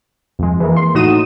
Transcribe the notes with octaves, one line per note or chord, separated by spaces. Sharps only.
F2 G#3
E3 G#3 A#3
C6
A2 D#4 F#4 D#6 D#7 E7